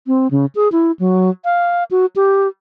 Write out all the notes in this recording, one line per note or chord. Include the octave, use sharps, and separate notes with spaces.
C4
C#3
G#4
E4
F#3
F5
F#4
G4